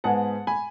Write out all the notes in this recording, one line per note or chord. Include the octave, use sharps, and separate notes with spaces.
G#2 G#3 B3 F#5 A5
G#5 B5